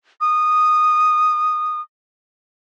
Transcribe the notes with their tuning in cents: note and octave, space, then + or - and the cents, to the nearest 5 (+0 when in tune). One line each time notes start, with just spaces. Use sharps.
D#6 -10